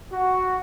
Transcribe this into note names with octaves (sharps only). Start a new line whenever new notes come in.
F#4